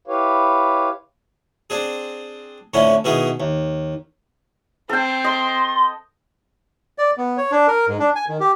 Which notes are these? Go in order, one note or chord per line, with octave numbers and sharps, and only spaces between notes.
E4 G4 B4 C#5 F5
C4 D4 G#4
F2 A2 D3 C#4 E4
B2 D#3 B3 E4 G#4
D#2
C4 A4 G5
D#5 C6
D5
B3
C#5
D4
A#4
G#2
D4
G#5
D#3
G4